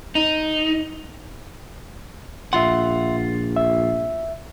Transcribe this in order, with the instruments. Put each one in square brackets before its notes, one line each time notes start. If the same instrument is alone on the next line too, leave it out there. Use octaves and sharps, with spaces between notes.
[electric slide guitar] D#4
[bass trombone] A#1 [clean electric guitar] F4 F#5 [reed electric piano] E5 C6
[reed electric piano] E5